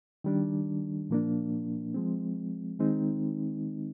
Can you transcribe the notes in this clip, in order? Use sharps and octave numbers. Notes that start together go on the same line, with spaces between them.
D#3 G3 D4
A#2 F3 A#3 D4
F3 G#3 C4
D#3 G#3 C4 D#4